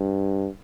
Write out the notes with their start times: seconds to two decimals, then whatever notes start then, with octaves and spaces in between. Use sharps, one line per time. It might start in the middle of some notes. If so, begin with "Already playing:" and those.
Already playing: G2